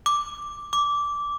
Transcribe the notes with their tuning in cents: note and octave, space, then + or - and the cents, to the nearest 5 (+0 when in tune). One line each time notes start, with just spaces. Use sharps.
D6 +0
D6 -15